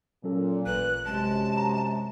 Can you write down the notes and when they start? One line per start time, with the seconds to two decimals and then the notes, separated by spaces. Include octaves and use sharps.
0.24 A#2 F#3 C#4 A4
0.66 A1 B4 F#6
1.06 F#2 C3 G#3 A5
1.57 A#5